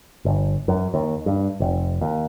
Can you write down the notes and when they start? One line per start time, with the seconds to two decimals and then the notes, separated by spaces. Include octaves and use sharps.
0.25 G1
0.68 F#2
0.94 D#2
1.26 G2
1.60 F1
2.01 D#2